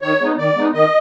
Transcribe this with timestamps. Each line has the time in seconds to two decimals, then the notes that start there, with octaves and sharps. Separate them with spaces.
0.02 D#3 C#5
0.20 G#3 B3 D#4
0.38 D#3 D5
0.56 G#3 B3 D#4
0.73 D#3 D#5